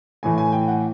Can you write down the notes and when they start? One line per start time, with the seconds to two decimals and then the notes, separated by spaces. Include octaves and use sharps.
0.23 A2 E3 A3 G#5
0.38 G#5
0.52 G5
0.68 F#5